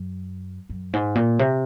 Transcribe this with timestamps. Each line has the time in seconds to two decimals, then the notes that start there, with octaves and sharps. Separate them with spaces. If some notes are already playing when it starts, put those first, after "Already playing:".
Already playing: F#2
0.69 F#2
0.93 G#2
1.15 A#2
1.39 C3